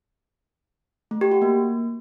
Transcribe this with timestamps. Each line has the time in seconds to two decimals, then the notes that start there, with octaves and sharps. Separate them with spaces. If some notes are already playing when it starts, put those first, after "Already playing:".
1.11 A3
1.21 G4
1.32 F#4
1.42 A#3